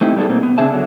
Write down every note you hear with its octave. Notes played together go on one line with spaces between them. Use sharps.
A3 C4 D#4 E4 G4
G3 B3 D4 F4 G#4 A4
B2 A#3 C4
B3
C#3 C4 D4 G#4 E5 A5
D3 F#3